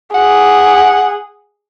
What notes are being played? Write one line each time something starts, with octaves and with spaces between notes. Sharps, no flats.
G#4 F#5